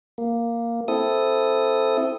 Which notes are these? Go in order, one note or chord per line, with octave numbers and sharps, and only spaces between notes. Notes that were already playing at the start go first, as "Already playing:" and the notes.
A#3
C4 E4 A4 D#6